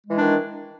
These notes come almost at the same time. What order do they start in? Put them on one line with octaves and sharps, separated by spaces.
G#3 E3 D4 D#3